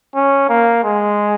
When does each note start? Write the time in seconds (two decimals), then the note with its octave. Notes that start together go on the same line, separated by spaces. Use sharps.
0.15 C#4
0.49 A#3
0.84 G#3